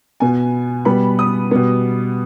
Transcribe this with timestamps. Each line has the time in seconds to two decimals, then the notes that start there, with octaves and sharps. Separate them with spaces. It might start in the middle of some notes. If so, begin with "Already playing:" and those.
0.20 B2 B3 G#5
0.85 B2 G3 B3 B5
1.19 D#6
1.51 B2 G3 B3